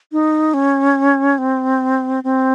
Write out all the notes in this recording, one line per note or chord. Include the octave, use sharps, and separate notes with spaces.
D#4
C#4
C4
C4